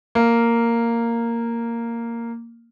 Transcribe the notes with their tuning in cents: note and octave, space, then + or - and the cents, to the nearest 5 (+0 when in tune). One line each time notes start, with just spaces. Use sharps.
A#3 -5